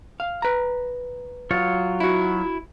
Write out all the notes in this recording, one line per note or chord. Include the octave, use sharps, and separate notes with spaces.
F5
B4 A#5
F#3 F4 C#5
E4 F#4